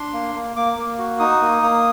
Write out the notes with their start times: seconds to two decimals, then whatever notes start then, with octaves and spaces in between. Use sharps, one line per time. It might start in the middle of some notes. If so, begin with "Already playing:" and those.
Already playing: D4 C6
0.13 A#3
0.35 A#3
0.56 A#3 D6
0.77 A#3
0.99 F#4
1.19 D#4 D#6
1.41 A#3
1.62 A#3